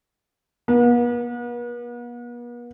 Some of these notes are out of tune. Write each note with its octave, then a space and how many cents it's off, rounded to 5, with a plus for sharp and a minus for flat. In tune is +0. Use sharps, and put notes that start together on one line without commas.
B3 -45